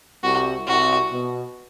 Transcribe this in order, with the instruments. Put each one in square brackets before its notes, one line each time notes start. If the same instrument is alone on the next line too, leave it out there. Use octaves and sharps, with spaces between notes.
[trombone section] C2 C3 [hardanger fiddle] F#4
[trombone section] C2 C3 [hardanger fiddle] F#4
[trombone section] B2